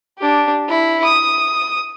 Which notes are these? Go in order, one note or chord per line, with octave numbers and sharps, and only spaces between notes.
D4 G4
E4 B5
D#6